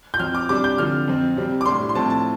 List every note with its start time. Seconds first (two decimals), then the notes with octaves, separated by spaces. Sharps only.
0.14 G6
0.19 F2 F3 C4 F6
0.35 D6
0.49 C3 G3 D4 D6
0.64 G6
0.78 D3 F3 C4 F6
1.08 F2 F3 C4
1.37 C3 G3 C4
1.61 D6
1.66 A2 G3 D4 C6
1.89 C6
1.95 A2 F3 C4 A5
2.10 A5